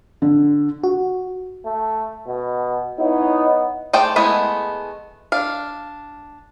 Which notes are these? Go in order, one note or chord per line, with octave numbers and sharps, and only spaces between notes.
D3
F#4
A3
B2
B3 D#4 E4 C#5
A3 G#4 C5 D5 G5
G#3 A3 B3 E4 G#4
D4 F5